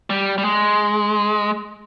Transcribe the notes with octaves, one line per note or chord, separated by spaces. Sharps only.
G3
G3
G#3